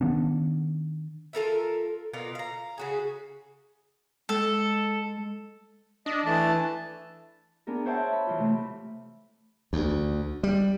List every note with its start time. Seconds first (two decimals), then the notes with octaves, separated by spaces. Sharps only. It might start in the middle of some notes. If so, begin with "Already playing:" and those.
0.01 D#3 B3 C#4 D4
1.33 F4 A4 A#4 E5
2.13 B2 F4 A#4 D5
2.35 F5 A#5
2.78 C#3 F#4 G#4
4.29 G#3 A4
6.06 D4 D#5
6.26 E3 A3 A5
7.67 B3 D4 G#4 A#4
7.86 C5 C#5 E5 F#5 G5 A5
8.13 B5
8.27 E3 F4
8.38 C3 A3
9.73 D2
10.43 G3